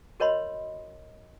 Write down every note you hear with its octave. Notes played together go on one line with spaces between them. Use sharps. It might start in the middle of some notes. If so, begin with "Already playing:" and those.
F#4 A#4 C#5 D#5 B5 C6